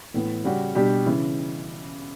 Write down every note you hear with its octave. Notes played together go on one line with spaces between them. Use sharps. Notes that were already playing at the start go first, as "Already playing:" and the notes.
A2 E3 B3
C#3 G3 C#4 F#4
B2 G3 D4 G4
C#3 E3